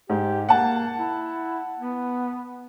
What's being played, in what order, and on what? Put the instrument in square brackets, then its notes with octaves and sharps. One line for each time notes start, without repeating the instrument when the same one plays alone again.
[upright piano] G#2 [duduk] G4
[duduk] A#3 [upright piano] F#5 A5
[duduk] E4
B3